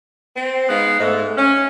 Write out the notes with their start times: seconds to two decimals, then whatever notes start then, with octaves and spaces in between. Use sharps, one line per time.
0.36 C4
0.69 G#3 B3 D#4 F5
1.00 G#2 A3
1.37 C#4